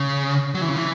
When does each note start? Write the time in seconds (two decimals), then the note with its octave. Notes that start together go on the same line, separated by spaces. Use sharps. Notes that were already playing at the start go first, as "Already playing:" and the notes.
Already playing: C#3
0.54 F#3
0.61 E3
0.69 C#3
0.76 E3